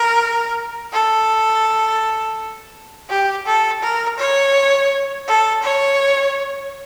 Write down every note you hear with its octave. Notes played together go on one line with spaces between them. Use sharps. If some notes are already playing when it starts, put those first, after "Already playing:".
Already playing: A#4
A4
G4
A4
A#4
C#5
A4
C#5